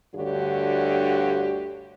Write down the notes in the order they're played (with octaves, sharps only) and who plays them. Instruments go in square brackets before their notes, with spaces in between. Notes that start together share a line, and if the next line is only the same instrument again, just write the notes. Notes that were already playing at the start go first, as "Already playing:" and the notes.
[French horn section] D2 G2 D3 F#4 G4 C#5